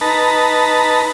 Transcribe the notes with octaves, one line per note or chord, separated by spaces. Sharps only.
D#4 B4 A5 A#5